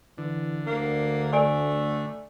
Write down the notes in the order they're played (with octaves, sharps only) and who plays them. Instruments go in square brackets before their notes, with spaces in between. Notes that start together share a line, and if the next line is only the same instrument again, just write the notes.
[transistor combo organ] D3 [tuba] E3
[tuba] D2 [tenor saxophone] A#3
[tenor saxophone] A3 [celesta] D5 G#5 D7